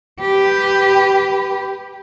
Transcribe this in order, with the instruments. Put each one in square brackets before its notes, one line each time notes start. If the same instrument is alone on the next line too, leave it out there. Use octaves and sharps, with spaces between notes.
[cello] G4 B4